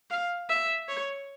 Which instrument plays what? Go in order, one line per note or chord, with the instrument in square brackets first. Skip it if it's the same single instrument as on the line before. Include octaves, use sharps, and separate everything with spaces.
[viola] F5
E5
C#5